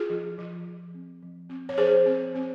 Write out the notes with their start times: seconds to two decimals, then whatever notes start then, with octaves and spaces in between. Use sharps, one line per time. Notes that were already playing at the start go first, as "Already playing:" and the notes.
Already playing: F4 G#4
0.10 F3
0.38 F3
0.66 F3
0.94 C4
1.23 F3
1.49 C4
1.69 C#5
1.78 F3 G#4 C5
2.06 C4
2.35 C4